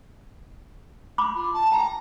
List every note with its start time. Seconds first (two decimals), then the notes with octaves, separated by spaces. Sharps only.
1.18 B5 C6 D6
1.35 F4
1.53 A5
1.72 G5 A#5